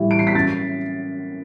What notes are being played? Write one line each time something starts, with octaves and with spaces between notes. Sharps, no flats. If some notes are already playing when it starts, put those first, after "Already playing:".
Already playing: A2 E3 G3
D7
C7
B6
F#2 A6